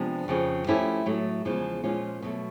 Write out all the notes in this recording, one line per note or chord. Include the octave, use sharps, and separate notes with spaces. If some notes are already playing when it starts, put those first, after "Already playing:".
Already playing: C3 F3 G#3 B3 D4
F2 C#3 F3
F3 A3 C#4 E4 G4
A2 F#3 A3
E2 C#3 F3 G#3 B3
A#2 F3 G#3 C#4 F4
B2 F#3 A3